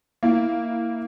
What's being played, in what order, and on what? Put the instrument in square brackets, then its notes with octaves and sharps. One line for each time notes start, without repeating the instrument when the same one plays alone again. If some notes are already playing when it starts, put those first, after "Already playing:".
[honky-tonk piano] A#3 E4